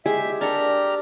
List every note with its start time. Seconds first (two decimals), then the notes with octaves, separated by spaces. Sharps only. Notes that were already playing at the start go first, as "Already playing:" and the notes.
0.06 G#3 G4 G#4 E5
0.41 D4 G4 A4 A#4 A#5 F6